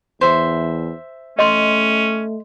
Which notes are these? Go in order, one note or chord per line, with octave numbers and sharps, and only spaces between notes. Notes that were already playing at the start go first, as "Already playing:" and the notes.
E2 C5 E5
A3 C#4 D#5 C6